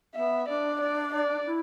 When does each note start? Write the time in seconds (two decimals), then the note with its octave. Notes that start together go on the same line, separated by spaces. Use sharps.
0.15 B3 E5
0.48 D4 D5
0.81 D5
1.14 D5
1.46 E4